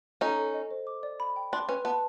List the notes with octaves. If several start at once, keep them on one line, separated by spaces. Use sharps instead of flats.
C#4 D#4 A4
A4
D#5
C5
D6
D5
B5
G5
D4 C6
C#4 B4
B3 A5